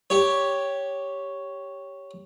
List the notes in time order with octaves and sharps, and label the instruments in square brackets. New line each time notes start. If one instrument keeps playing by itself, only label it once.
[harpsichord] G4 C#5